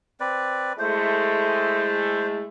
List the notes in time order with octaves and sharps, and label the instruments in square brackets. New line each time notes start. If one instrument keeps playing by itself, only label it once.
[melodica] C4 B4 D5
[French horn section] G#3 A3 E4 [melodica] C5